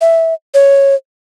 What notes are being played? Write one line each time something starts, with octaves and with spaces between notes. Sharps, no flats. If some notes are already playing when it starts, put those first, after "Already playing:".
E5
C#5